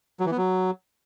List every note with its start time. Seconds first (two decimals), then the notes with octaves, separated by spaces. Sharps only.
0.20 F#3
0.26 E3
0.32 B3
0.37 F#3